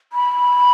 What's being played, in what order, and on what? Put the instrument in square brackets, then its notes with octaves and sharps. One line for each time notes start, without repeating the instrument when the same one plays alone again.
[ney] B5